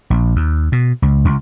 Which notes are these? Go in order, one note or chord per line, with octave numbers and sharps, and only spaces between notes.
A#1
D#2
B2
C#2
C#2